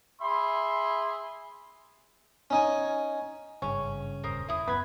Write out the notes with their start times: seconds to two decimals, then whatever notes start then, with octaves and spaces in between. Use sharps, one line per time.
0.22 G#4 E5 B5 C6
2.50 C#4 D#4 G#5
3.62 G#1 G2 C#3 C#4
4.24 D#1 F2 A#4 C5 D#6
4.49 D#2 E4 D#6
4.68 F#2 B3 F4 B4 B5 G#6